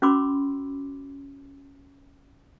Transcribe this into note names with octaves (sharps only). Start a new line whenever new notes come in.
C#4 F#4 B5 C6 D6 E6